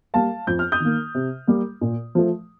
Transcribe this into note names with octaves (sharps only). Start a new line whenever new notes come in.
G3 A#3 F5 A5
F2 G6
F6
D#6 G6
D#3 A#3
C3
G3 A#3
A#2
F3 A3